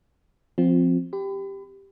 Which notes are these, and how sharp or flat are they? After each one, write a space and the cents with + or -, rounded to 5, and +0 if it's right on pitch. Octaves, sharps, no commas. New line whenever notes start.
F3 +0 C4 +0 F4 +25
G4 +0 B5 +35